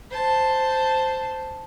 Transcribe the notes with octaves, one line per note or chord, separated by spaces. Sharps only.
C5 A5